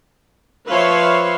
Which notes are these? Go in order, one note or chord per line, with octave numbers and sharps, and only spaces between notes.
F3 B4 C#5 E5 F5 C6